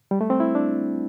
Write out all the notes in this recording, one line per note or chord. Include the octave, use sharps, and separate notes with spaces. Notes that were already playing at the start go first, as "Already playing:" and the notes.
G3
A3
C4
E4
D4